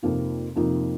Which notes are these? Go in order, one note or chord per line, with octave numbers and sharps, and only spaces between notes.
F2 C3 F3 A#3 D#4
F2 C3 F3 A#3 D#4